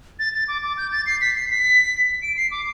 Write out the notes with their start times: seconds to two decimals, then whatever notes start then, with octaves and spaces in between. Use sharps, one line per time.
0.19 A6
0.34 A6
0.48 D6
0.63 D6
0.77 G6
0.92 A6
1.06 C7
1.21 B6
1.36 C7
1.50 B6
2.22 D7
2.37 C7
2.51 D6